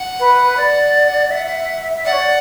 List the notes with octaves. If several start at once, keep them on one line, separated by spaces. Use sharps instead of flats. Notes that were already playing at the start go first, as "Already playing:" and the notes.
Already playing: F#5
B4
D5
E5
E5
E5
E5
E5
D5 F#5
C#5
D5